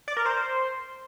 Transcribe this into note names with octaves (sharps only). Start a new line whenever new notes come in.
D5
A#4
C5